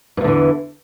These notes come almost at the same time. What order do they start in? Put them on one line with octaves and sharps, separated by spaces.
G2 E2 D3 E3